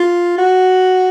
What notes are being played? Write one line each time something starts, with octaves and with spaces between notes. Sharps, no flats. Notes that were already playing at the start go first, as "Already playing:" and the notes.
Already playing: F4
F#4